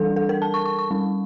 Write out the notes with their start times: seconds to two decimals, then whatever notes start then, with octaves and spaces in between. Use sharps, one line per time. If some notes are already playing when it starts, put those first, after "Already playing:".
Already playing: E3 G3 D4 A4
0.16 A4
0.29 A#4
0.42 A5
0.54 C#6
0.65 C#6
0.79 C#6
0.91 G3 C#4